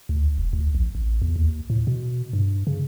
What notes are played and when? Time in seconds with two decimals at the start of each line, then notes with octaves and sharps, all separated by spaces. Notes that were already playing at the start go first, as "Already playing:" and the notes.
0.09 D2
0.38 E1
0.53 D2
0.75 A#1
0.95 A1
1.22 E2
1.36 D#2
1.70 A2
1.87 B2
2.33 G2
2.67 C#3